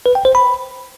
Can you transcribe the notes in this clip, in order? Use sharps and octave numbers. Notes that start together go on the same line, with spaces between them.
B4
G5
C5
B5